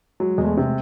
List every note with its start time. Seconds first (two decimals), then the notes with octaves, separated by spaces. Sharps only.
0.20 F#3 G#3
0.38 E2 G#3
0.44 A3
0.57 C3